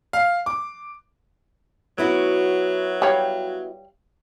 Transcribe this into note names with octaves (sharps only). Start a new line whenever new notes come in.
F5
D6
F#3 B3 E4 F#4
G3 C#5 F5